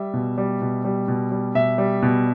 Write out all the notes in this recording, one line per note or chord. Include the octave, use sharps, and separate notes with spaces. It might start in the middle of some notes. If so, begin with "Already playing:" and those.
Already playing: G3 E5
B2
G3
B2
G3
B2
G3
B2 E5
G3
B2